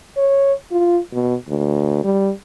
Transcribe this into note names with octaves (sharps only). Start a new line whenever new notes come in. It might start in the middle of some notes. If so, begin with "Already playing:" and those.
C#5
F4
B2
D2
G3